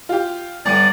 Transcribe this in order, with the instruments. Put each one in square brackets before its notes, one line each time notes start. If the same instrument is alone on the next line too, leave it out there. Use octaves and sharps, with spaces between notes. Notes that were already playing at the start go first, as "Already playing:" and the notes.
[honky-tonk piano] F4 G4
[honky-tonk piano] G1 D#7 [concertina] D5